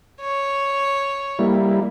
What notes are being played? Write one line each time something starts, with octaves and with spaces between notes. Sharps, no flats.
C#5
G3 A#3 E4